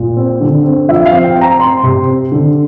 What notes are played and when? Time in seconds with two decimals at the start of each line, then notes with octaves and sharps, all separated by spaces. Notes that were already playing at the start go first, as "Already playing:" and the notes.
Already playing: A#2
0.17 C4
0.41 D3
0.64 C4
0.89 F3 E5
1.06 F5
1.12 C4
1.24 G5
1.35 C4
1.41 A#5
1.60 C4 C6
1.83 C3
2.07 C4
2.32 D3